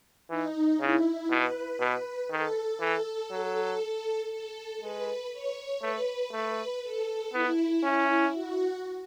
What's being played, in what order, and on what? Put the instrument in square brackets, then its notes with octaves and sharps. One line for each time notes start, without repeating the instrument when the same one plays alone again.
[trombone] E3 [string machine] D#4
[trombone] C#3 [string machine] E4
[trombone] B2 [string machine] B4
[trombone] B2
[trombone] D#3 [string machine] A4
[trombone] E3 [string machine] A4
[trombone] F#3
[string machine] A4
[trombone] G#3 [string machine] B4
[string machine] C#5
[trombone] A3 [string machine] B4
[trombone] A3 [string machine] B4
[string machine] A4
[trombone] B3 [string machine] E4
[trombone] C#4
[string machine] F#4